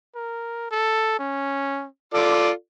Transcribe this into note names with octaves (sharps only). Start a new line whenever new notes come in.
A#4
A4
C#4
F4 A4 D5 D6